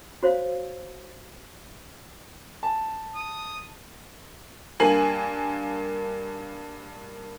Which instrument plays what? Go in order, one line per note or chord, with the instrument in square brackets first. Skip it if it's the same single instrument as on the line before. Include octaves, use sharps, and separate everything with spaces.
[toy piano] F#4 C5 C#5 F5
[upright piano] A5
[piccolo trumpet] D#6
[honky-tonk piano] G2 A#3 G#5 C7 F#7